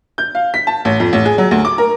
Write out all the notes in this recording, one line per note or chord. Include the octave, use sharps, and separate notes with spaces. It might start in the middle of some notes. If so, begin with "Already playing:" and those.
G6
F5
B6
A5
A1
F2
A1
G#4
F#3
D2
D6
A#4